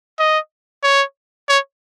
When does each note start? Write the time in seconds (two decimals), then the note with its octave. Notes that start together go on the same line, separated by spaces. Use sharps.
0.19 D#5
0.83 C#5
1.49 C#5